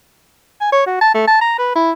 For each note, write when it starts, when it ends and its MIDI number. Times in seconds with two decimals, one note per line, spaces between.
0.61 0.68 80
0.72 0.84 73
0.86 1.00 66
1.01 1.09 81
1.14 1.28 57
1.28 1.39 81
1.41 1.55 82
1.59 1.72 71
1.75 1.92 64